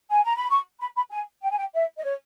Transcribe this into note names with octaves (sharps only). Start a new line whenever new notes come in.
G#5
A#5
B5
C#6
B5
B5
G#5
G5
G#5
G5
E5
D#5
C#5